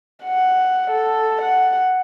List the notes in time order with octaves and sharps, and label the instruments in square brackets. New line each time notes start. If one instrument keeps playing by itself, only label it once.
[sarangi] F#5
A4
F#5